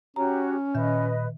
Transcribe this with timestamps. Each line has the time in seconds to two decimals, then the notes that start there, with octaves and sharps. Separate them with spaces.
0.16 C#4 F#4 G4 C#5 A#5
0.75 A#2 D#3 B4 D#5 E5